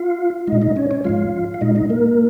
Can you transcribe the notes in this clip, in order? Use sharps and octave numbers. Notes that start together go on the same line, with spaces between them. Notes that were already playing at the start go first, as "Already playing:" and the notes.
Already playing: F4 F5
A#2 G#3 D#4 D#5
D#4 D#5
C#4 C#5
C#4 C#5
G#2 F3 G#3 F4 F5
F5
A#2 G#3 D#4 D#5
D#4 D#5
A#3 A#4